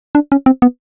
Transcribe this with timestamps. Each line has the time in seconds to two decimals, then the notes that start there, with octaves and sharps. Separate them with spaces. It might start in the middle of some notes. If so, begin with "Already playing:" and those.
0.15 D4
0.32 C#4
0.46 C4
0.62 B3